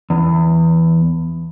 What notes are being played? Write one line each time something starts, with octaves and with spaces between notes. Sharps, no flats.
E2